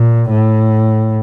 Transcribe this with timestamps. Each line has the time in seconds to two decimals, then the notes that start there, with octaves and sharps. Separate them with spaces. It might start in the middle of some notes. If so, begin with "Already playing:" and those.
Already playing: A#2
0.30 A2